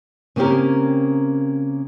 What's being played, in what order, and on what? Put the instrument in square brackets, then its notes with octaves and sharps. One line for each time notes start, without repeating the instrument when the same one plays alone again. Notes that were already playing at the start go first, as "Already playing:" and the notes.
[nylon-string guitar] C#3 A#3 C4 C#4 G4 A#4